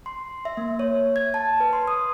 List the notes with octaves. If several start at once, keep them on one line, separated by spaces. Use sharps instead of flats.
C6
E5
A#3
C#5
G#6
A5
B4
C6
D#6